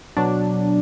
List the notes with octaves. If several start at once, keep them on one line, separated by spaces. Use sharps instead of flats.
B2 F#3 D4